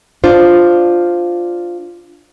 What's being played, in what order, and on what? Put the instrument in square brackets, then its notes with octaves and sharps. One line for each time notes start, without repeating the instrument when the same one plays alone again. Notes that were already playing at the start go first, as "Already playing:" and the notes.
[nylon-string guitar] D4 F4 C5